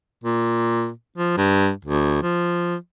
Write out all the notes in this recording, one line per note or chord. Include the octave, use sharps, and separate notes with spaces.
A#2
F3
G2
D2
F3